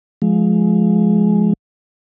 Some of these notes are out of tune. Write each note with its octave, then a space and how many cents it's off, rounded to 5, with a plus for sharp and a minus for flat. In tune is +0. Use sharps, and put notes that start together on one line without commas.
F3 +5 G#3 +20